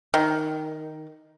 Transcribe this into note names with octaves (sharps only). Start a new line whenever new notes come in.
D#3